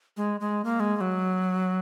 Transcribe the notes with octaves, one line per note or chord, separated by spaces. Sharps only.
G#3
G#3
A#3
G#3
G#3
F#3